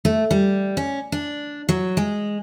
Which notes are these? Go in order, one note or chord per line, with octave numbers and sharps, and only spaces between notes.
A3
G3
C#4
D4
F#3
G#3